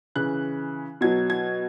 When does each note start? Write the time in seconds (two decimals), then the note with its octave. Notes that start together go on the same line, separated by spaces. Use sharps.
0.15 C#3 E3 F#6
1.01 B2 F#3 G#6
1.30 G#6